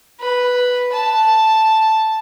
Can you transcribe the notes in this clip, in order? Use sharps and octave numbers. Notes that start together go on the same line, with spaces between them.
B4
A5